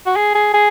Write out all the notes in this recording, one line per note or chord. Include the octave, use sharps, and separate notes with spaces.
F#4
G#4
G#4
G#4